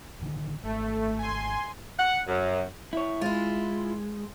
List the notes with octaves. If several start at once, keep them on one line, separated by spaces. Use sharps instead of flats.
A1 D3 D#3
G#1 A3
G#5 C6
F#5
F#2
E4 C#5
G#3 E4 F4